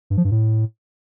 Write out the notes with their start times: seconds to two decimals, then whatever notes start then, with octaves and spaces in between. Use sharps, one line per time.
0.10 G2
0.17 F3
0.24 G2
0.31 A2